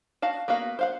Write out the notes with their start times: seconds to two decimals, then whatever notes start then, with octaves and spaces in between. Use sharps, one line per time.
0.22 F#4 F5 A5
0.48 A#3 B3 F#4 F5
0.79 C5 F5 F#5